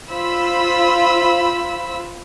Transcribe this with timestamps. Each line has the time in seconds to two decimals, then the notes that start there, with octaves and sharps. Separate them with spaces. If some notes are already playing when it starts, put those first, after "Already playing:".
0.10 F4 C5 B5 E6